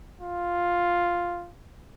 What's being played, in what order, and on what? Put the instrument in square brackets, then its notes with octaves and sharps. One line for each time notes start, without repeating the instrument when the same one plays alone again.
[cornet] F4